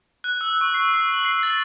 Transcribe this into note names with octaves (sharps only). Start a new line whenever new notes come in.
F#6
E6
C#6
C7
C7
F#7
C7
A6